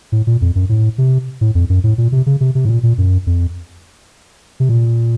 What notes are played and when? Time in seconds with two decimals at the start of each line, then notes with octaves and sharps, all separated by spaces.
0.12 A2
0.27 A#2
0.41 F2
0.55 F#2
0.69 A2
0.98 C3
1.41 A2
1.55 F2
1.70 F#2
1.84 A2
1.98 A#2
2.12 C3
2.26 C#3
2.41 C3
2.55 C3
2.65 A2
2.69 A#2
2.83 A#2
2.98 F#2
3.27 F2
4.60 C3
4.69 A#2